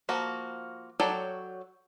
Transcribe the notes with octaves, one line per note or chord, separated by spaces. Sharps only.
F3 A#3 F#4
F#3 A4 C#5 D5 G5